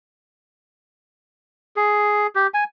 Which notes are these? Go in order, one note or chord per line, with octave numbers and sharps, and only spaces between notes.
G#4
G4
G#5